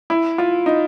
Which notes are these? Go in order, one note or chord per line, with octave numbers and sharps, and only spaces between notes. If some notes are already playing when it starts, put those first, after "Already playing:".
E4
F4
D#4